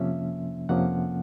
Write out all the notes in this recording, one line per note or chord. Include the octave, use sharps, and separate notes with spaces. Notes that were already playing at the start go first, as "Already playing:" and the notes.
Already playing: F2 C3 F3 A#3 C#4 E5
F2 C3 F3 A#3 C#4 F#5